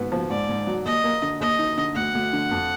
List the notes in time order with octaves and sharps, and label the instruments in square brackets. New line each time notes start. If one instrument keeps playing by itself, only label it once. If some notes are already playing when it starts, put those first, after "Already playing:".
Already playing: [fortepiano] G#2 B3
F3
[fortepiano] G#2 [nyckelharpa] D5
[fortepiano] G#2
F#3
[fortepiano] D#2 [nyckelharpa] D#5
[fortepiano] A#3
D3
[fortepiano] D#2 [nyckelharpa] D#5
[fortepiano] D#4
D3
[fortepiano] D2 [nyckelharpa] F#5
[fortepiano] D2
D3
F2